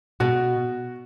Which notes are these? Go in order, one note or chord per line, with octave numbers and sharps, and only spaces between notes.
B2 F#4